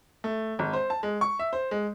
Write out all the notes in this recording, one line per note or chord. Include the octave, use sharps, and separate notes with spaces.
A3
G#1
C5
A5
G#3
C#6
E5
C5
G#3